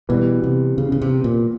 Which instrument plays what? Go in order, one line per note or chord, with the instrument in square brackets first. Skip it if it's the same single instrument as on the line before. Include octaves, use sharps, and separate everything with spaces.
[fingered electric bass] B2 [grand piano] E3 G3 B3
[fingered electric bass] C3
C#3
C#3
C3
A#2